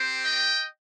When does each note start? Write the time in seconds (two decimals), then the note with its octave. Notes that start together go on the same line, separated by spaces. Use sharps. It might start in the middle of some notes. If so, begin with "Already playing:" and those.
Already playing: C4 G4 C5
0.23 D#5 G5